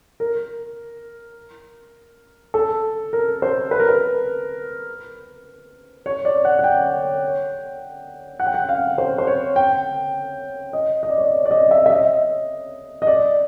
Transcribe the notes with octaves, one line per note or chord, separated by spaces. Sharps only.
A#4
A4
A#4
C5
B4
A#4
B4
C#5
D5
F#5
F#5
G5
F#5
G5
F#5
F5
C5
C5
C#5
G5
D#5
D#5
D5
C#5
D5
D5
D#5
E5
E5
D#5
D#5
D5